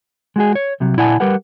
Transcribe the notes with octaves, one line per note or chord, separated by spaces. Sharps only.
G#3 F#4 G#4
C#5
C2 C3 F#3
A#2 E4 D5 F#5 G#5 A5
G3 G4 A#4 B4 F#5